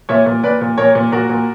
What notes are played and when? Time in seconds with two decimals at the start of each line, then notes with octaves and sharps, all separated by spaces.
0.09 A#2 C#5 E5
0.26 A#2
0.43 A#2 B4 D5
0.61 A#2
0.78 A#2 A#4 C#5
0.95 A#2
1.12 A#2 F#4 A#4
1.29 A#2